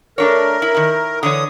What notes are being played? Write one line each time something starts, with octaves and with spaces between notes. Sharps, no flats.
A3 D4 A#4 C#5
E4
D#3 E4
D3 E3 C#5 D#6